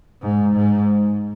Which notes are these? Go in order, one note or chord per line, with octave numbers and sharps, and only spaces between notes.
G#2
G#2